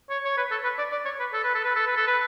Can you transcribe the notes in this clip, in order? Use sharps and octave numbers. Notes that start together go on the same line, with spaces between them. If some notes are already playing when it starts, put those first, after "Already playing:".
C#5
C#5
B4
A4
B4
D5
D5
C#5
B4
A4
B4
A4
B4
A4
B4
A4
B4